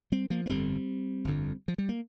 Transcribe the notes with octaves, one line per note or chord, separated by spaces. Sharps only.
G3 C4
F3 A#3
A#3
G1 F2 D3 G3 C4
G1 F2 D3
F3
G3
A#3